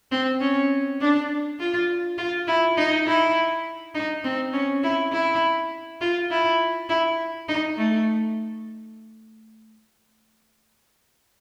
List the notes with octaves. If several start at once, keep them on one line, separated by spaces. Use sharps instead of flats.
C4
C#4
D4
F4
F4
E4
D#4
E4
D#4
C4
C#4
E4
E4
F4
E4
E4
D#4
A3